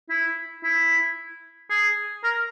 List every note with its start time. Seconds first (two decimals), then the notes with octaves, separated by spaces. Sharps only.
0.10 E4
0.64 E4
1.70 G#4
2.24 A#4